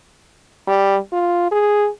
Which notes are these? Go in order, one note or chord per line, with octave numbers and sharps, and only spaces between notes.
G3
F4
G#4